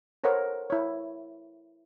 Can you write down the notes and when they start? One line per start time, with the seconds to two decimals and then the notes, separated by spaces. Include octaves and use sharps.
0.24 A4 A#4 C5 C#5 F#5
0.70 E4 C#5